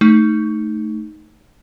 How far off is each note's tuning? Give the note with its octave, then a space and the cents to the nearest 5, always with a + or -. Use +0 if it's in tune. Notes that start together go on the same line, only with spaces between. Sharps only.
A3 +0 D#4 +0